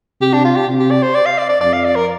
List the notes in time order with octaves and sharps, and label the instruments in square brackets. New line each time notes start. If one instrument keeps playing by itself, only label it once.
[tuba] C3 [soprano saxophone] G4
[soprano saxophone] D4
F4
G4
[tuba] C3
[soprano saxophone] G4
D5
C5
D5
F5
D5
D5
[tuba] F2 [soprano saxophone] D5
[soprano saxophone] F5
D5
A#4